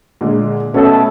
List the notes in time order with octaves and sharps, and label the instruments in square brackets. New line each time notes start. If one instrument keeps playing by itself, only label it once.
[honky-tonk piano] A#2 D3 G#3
[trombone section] B2 A3 A4 [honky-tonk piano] C#4